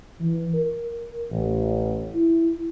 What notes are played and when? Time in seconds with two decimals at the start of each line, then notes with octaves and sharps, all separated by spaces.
0.20 E3
0.54 A#4
1.31 A1
2.15 E4